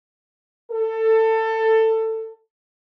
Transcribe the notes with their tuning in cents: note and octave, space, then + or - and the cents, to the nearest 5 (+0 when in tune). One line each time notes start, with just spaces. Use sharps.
A4 +20